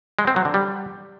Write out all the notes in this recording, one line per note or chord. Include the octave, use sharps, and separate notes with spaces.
G#3
C4
F#3
D3
G3